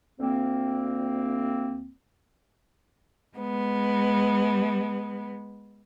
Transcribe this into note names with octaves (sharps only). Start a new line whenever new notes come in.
D2 A#3 C4
G#3 B3